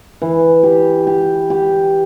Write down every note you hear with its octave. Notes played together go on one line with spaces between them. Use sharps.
E3
G4
G4
G4